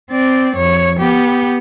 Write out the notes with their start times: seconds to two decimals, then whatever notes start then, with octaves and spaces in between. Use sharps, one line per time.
0.11 C4 D5
0.57 F2 C#5
0.99 B3 G4